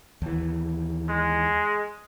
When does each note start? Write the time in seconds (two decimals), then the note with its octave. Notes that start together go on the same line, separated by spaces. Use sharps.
0.22 D#2 E3
1.09 G#3